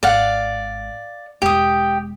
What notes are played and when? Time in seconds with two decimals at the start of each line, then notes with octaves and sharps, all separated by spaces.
0.03 G#1 D5 F5 F#5
1.42 E1 G#3 G4 D#6